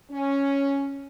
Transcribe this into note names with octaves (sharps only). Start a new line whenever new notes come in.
C#4